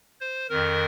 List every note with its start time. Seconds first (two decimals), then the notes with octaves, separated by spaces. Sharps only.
0.21 C5
0.50 F2 D#3 A#4